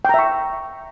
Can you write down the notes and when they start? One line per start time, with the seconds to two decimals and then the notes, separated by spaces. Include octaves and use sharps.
0.05 G5
0.09 A#5
0.14 E5
0.19 C#6